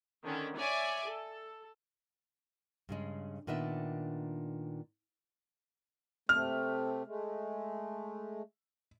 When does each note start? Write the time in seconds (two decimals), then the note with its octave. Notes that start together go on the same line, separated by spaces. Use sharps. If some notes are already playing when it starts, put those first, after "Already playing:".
0.25 D3 D#3 C#4
0.58 C#5 D5 E5 G#5 D6
1.05 A4
2.89 G2 C#3 G#3
3.47 A#2 D#3 B3 D4 E5
6.29 C3 A3 F6
7.06 G#3 A3